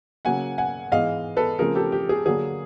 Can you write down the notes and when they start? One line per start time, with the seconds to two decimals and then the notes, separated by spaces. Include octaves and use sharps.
0.25 C#3 F#3 A#3 F#5 G#5
0.58 F#5 G#5
0.92 G#2 E3 G#3 B3 D#5 F5
1.37 A4 B4
1.59 C#3 F3 A3 C4 G#4 A#4
1.75 G4 A4
1.92 G4
2.09 G#4
2.26 D3 F#3 A#3 G#4